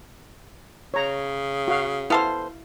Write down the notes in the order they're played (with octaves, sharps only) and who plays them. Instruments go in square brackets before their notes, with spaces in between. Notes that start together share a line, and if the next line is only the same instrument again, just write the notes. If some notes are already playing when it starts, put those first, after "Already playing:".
[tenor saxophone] C#3 [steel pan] C#5 A#5
[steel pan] F#4 F5
[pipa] B3 A4 C5 [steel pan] E4 F5